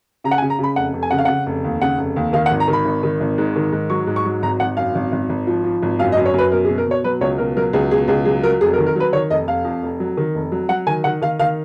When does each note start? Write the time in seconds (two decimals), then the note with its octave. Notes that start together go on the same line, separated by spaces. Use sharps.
0.24 C#3 A#5
0.31 F#5
0.38 G#5
0.42 C#3
0.50 A#5
0.59 C#3 B5
0.76 F1 F#5
0.94 F1
1.03 G#5
1.11 C#3 F#5
1.18 F5
1.25 C#3 F#5
1.46 F1
1.64 D#2
1.81 C#3 F#5
1.98 F1
2.16 D#2
2.33 D#3 F5
2.46 F#5
2.51 G#1
2.60 A#5
2.68 D#3
2.73 B5
2.85 G#1
3.03 D#3
3.21 G#1
3.38 G#2
3.56 D#3
3.72 G#2
3.90 F#3 C#6
4.07 G#2
4.16 C#6
4.25 F#3
4.42 G#1 A#5
4.60 G#1 F#5
4.77 F#2 F5
4.95 G#1
5.12 G#1
5.29 G#1
5.47 F3
5.64 F3
5.82 G#1
5.99 F#2 F5
6.12 D#5
6.16 F#2
6.26 C#5
6.34 F#2 B4
6.52 B2 A#4
6.65 G#4
6.69 B2
6.78 A#4
6.86 B2 C#5
7.04 F#3 B4
7.21 C#2 C#5
7.38 B2 A#4
7.56 F#3 A#4
7.73 C#2 G#4
7.91 B2 G#4
8.08 C#2 G#4
8.25 F#3 G#4
8.43 F#3 A#4
8.61 F1 G#4
8.73 A#4
8.78 D#3
8.86 A#4
8.96 F#3 B4
9.13 D#3 C#5
9.30 F1 D#5
9.47 F1 F5
9.65 F2
9.83 F1
10.00 F#3
10.17 D#3
10.35 F1
10.52 F#3
10.69 F#3 F#5
10.87 D#3 G#5
11.04 D#3 F#5
11.22 D#3 F5
11.39 D#3 F5